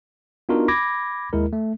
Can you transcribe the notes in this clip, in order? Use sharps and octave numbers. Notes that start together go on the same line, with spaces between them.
B3 D4 D#4 F4 F#4 A#4
B5 D6 G#6 A#6
D#2 G#3 E4 A#4
A3